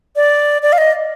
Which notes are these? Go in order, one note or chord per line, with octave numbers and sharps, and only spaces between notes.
D5
D5
F5
D#5